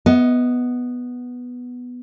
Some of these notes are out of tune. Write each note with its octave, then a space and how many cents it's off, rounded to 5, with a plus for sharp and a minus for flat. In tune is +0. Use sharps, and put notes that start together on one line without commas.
B3 +0 D#5 +20